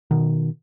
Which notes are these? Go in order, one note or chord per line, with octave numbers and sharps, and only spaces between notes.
B2 D#3